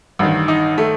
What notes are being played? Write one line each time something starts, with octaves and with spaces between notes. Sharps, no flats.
A1 G2 D#3
D#4
A3